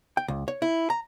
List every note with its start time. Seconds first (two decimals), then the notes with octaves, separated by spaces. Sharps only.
0.17 G5
0.28 C#2
0.48 C#5
0.62 E4
0.90 A#5